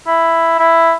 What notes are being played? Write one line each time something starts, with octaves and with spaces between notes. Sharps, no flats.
E4
E4